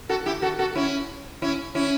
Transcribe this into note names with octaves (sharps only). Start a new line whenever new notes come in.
F#4 A4
E4 G4
F#4 A4
F#4 A4
C#4 E4
C#4 E4
C#4 E4